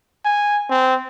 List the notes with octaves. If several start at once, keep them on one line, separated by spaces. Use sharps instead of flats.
G#5
C4